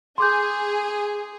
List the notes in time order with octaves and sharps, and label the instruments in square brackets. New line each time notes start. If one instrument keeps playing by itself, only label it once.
[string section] G#4 [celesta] C6 D6 G6